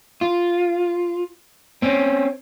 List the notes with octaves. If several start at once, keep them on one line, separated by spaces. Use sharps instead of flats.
F4
C4 C#4